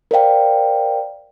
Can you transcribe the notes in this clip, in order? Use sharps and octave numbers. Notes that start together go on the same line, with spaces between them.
A#4 C5 D5 F5 G5